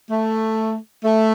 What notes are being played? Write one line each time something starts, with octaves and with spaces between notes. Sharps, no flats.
A3
A3